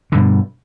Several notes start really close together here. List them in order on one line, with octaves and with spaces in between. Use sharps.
D3 G2 B2